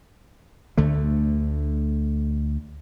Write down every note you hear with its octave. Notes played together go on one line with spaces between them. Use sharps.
D2 D3 A3